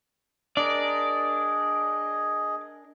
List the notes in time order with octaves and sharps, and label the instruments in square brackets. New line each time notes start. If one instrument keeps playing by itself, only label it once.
[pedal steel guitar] D4 A#4 [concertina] G#4 D#5 [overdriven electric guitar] D5